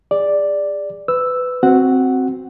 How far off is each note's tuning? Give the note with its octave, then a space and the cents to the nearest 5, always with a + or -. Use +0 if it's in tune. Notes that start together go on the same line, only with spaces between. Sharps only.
G#4 -30 D5 +0
B4 +20 E6 +0
C4 +0 F#4 +0 F#5 +0